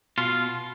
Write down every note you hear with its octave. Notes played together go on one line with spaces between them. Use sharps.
B2 F4